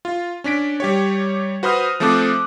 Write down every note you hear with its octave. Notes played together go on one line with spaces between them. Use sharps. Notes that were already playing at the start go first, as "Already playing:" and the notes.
F4
C#4 D4 B6 D7
G3 G4 C#5
F#4 B4 C5 B5 D#6 F6
F3 A3 C4 A4 D6 F#6